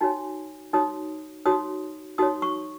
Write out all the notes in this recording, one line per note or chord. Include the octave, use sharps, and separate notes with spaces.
D#4 F#4 C#5 G#5
D#4 F#4 C#5 D#6
D#4 F#4 C#5 D#6
D#4 F#4 C#5 D#6
C#6